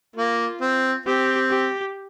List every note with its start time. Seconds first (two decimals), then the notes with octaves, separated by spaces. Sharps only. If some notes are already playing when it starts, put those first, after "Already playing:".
0.16 A#3 F4
0.61 C4
1.06 C4 G4
1.51 G4